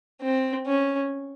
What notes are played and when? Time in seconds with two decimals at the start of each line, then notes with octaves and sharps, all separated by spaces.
0.22 C4
0.66 C#4